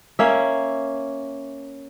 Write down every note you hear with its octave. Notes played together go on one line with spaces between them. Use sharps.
A#3 C#4 E5